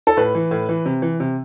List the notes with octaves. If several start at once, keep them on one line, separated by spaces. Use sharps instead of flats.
A4
A2 B4
E3
A2
E3
C3
E3
C3